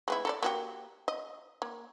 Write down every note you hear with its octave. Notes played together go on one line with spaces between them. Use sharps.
G#3 B3 E4
A4 A#4 D5
A#3 F#4 G4
D#5
A#3